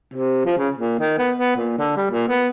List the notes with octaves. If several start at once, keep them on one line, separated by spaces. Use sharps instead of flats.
C3
F3
C#3
A#2
D#3
B3
B3
A#2
D3
G3
A#2
B3